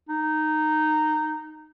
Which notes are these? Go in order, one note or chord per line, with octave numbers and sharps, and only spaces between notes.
D#4